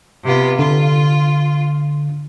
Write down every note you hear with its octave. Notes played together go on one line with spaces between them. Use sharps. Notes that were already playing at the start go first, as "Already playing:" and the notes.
C3 B3 F4
D3 F4